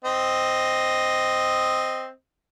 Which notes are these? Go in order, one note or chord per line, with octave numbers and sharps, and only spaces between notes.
C4 D#5